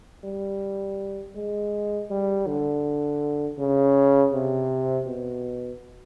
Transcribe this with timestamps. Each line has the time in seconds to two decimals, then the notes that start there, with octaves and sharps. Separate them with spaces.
0.24 G3
1.36 G#3
2.10 G3
2.47 D3
3.58 C#3
4.33 C3
5.07 B2